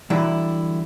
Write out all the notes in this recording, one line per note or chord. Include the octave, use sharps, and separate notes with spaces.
D3 E3 F#3 G3 E4